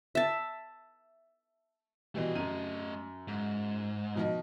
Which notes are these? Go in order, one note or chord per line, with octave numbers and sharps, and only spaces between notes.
E5 A5
B2 E3 G3 A3 D#5
F#2 D#7
G#2
B2 F3 D#4